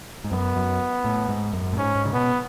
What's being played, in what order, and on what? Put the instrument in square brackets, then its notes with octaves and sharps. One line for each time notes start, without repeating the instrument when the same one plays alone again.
[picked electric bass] G#2
[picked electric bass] F#2 [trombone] B3
[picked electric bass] F#2
A2
G#2
F#2
A2
[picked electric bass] G#2 [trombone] C#4
[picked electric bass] G#2
C#3
[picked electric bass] B2 [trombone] B3